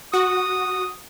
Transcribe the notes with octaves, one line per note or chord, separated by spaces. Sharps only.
F#4 D#6